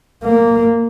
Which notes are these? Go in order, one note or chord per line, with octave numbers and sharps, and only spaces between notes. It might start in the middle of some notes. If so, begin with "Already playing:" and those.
A#3